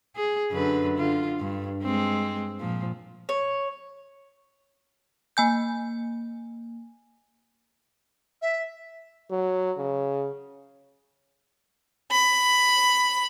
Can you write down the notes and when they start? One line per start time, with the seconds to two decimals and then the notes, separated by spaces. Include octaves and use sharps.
0.16 G#4
0.51 F#2 D3 B4
0.98 D3 F4
1.39 G2
1.83 G#3 C4
2.60 A#2 F3
3.29 C#5
5.37 A#3 G#5 G6
8.41 E5
9.31 F#3
9.78 C#3
12.11 B5